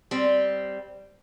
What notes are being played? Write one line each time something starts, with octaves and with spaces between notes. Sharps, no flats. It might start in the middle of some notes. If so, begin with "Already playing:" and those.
G3 C4